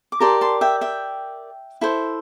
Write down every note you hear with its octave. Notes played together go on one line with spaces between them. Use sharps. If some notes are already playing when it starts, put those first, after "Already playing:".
D6
G4 A#4 D5 A5 C6
A5 C6
E5 G5
E5 G5
E4 A4 C5